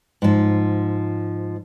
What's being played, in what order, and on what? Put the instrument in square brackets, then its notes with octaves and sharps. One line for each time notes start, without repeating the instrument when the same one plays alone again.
[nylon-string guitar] G#2 F3